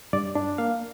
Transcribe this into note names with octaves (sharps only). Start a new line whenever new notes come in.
G2 D5
D4
A#3 F5